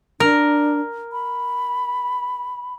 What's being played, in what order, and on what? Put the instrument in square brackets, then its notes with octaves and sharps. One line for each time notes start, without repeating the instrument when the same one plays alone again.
[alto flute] D4 [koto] A#4
[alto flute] B5